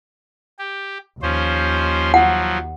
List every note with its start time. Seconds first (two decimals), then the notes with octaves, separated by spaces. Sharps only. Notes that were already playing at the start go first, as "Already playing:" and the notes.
0.59 G4
1.22 D#2 F3 C#4 C5
2.14 F3 F#3 F#5